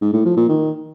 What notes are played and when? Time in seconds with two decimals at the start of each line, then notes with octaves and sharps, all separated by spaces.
0.02 G#2
0.13 A2
0.25 F3
0.37 A#2
0.49 D#3